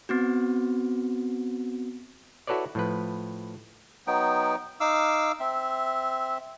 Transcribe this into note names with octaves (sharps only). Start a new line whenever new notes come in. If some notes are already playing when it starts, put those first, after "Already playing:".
B3 C4 F#4
E4 F#4 A4 B4 C#5 D5
A2 F3 B4
F#3 B3 D#4 G5
D#4 F5 D6 E6
C4 E5